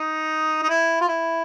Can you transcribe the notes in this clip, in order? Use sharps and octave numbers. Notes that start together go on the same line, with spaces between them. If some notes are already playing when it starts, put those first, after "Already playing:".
Already playing: D#4
D#4
E4
F4
E4